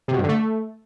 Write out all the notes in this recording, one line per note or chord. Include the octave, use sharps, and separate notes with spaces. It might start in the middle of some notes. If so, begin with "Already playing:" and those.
C3
B2
G2
D3
A3